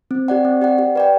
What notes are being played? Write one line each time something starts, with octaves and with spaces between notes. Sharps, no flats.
C4
G4 D5 F#5
C4
G4 D5 F#5
G4
B4 D5 G5